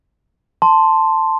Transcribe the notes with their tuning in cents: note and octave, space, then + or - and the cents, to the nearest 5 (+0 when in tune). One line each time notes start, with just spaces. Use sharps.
A5 +5 C6 +0